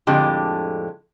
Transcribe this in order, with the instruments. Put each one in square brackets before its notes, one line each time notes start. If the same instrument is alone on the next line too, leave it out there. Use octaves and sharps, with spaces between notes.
[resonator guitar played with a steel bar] F2 A2 D3 G#3 G4 A5